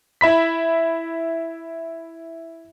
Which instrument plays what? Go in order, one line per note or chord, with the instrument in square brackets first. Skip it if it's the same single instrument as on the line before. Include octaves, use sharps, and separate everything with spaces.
[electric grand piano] E4 E5 B5 B6